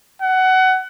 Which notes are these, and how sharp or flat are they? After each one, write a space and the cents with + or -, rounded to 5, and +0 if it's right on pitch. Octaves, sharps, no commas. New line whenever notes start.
F#5 +20